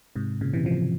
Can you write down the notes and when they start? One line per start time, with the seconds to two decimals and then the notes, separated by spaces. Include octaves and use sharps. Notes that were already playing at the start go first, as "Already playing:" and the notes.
0.16 G#2 C3
0.41 A#2 C#3
0.54 C3 E3
0.66 C#3 F3